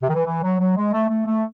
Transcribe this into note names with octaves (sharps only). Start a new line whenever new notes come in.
C3
D#3
E3
E3
F#3
F#3
G#3
A3
A3
A3